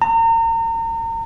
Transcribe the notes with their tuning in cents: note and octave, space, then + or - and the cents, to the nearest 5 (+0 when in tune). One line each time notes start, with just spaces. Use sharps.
A#5 -35